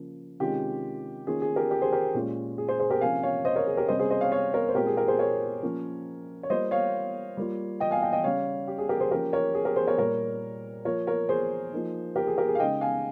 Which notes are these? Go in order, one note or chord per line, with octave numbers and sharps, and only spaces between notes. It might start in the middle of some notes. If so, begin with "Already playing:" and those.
Already playing: C#3 F3 A#3
C3 D#3 G#3 C#4 F4 G4
D#3 A#3 C#4 F4 G#4
G#4
G4 A#4
G4 A#4
G#4 C5
G4 A#4
A#2 G#3 C#4 F4
G#4
G#4 C5
G#4 C5
G4 A#4
C3 F3 A#3 C#4 F5 G#5
C#5 F5
C5 D#5
A#4 C#5
G#4
G4 A#4
C3 G3 C#4 C5 D#5
G#4 C5
C5 D#5
C#5 F5
C#5 F5
A#4 C#5
C5
A#2 G#3 C4 F4 G4 A#4
G#4
G4 A#4
G#4 C5
A#4 C#5
F3 A#3 C#4 F4
C#5
G3 A#3 F4 C5 D#5
C#5 F5
G3 A#3 F4
D#5 G5
F5 G#5
D#5 G5
D#5 G5
C#3 G3 C#4 C#5 F5
G4
G#4
G4 A#4
G#4 C5
F3 A#3 C#4 G4 A#4
A#4 C#5
G#4
G4 A#4
G#4 C5
A#4 C#5
A#2 G3 A#3 A#4 C#5
F3 A#3 F4 A#4 C#5
A#4 C#5
G#4 C5
F3 A#3 D#4
G4 A#4
G#4
G4 A#4
G#4
F5
C#3 G#3 D#4 D#5 G5
F5 G#5